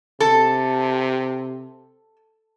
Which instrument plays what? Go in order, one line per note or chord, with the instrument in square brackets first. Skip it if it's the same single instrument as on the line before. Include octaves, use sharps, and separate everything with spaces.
[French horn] C3 [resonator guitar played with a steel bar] A4